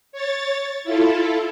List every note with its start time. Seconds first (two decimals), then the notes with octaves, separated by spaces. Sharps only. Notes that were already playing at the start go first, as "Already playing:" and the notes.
0.12 C#5 A6
0.84 E4 F4 A4